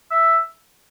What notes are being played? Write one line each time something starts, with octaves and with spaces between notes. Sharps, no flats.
E5